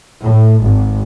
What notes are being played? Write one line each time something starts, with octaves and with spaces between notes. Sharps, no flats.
A2
G#1